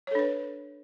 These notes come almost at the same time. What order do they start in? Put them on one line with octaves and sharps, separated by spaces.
C#5 A4 D4 B4